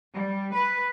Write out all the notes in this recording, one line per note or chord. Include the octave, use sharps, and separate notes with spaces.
G3
B4